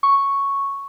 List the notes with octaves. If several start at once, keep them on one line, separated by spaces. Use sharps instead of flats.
C#6